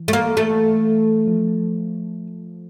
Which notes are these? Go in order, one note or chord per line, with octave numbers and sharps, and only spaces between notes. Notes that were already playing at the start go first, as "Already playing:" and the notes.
Already playing: E3
A3
A#3
A3
F3